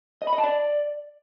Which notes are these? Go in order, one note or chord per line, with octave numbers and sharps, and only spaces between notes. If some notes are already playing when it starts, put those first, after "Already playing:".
D#5
B5
D#5
A5
D5